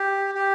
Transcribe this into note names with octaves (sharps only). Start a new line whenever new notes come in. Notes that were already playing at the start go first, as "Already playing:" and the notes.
Already playing: G4
G4